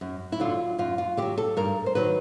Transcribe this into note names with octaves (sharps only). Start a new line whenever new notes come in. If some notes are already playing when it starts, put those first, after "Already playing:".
F#2
E4
D3 F#3 F4
F#2 F4
F4
D3 F#3 G4
A4
G2 A#4
C5
D#3 F#3 B4